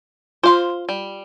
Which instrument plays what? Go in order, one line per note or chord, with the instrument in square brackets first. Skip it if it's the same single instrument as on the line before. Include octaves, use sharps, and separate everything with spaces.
[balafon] F4 C6 [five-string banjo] C5 F5
[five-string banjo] G3